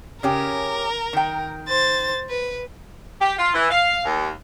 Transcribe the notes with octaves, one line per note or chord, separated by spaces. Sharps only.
C#3 C#4 G4 A#4
D#3 G5
C5 A6
B4
G4
F4
E3
F5
D#2